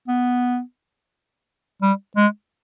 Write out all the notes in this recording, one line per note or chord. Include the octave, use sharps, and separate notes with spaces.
B3
G3
G#3